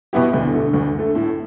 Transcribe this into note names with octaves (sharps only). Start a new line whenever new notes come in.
B2 B3 E4 G4
D2
D3 A3
D2
D3 A3
A2